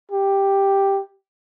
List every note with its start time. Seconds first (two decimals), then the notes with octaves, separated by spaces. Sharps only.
0.12 G4